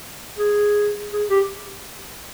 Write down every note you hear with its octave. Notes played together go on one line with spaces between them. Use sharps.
G#4
G#4
G4